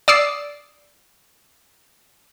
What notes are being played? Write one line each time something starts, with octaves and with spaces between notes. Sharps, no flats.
D5 D#6 E6 C7